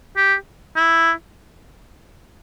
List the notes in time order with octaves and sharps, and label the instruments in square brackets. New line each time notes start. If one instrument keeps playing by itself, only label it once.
[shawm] G4
E4